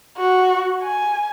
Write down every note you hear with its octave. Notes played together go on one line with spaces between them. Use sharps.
F#4
G#5